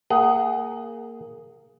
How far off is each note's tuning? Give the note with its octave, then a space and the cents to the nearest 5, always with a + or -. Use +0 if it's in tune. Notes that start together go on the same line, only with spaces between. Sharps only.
A#3 -15 G#4 +0 F#5 +35